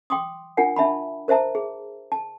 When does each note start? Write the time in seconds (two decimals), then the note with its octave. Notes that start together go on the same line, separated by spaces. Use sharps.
0.10 G5 C6 D6 D#6
0.57 D4 F4 A#4 F#5 G#5
0.76 D4 E5 A5 B5
1.28 A#4 C5 E5 A5 A#5
1.55 G#4
2.12 A5